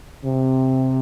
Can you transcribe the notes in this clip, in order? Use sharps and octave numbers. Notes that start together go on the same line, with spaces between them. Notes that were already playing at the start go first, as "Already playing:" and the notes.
C3